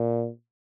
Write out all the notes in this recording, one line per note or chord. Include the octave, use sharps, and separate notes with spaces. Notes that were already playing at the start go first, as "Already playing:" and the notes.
Already playing: A#2